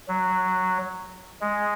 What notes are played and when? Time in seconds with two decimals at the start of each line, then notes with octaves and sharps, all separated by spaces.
0.08 F#3
1.41 G#3